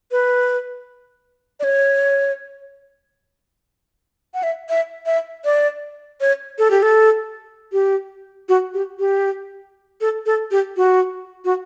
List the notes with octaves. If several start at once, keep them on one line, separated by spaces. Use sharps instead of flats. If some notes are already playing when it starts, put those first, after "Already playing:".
B4
D5
C#5
F#5
E5
E5
E5
D5
C#5
A4
G4
A4
G4
F#4
G4
G4
A4
A4
G4
F#4
F#4